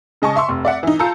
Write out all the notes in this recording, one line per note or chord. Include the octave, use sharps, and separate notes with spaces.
C#3 G#3 D#5 G#5 A5 C#6
E5 C6 C#6 E6
F1
D5 E5 F#5
E3 D#4
F4 A5 A#5 E6 G6 C#7